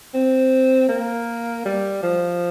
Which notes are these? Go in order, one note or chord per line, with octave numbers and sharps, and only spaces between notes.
C4
A#3
G3
F3